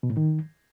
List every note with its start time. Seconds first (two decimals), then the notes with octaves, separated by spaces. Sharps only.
0.03 B2
0.10 A2
0.17 D#3